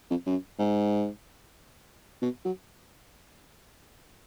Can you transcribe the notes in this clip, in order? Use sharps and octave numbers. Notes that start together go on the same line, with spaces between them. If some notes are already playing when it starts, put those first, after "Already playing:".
F2
F#2
G#2
B2
F#3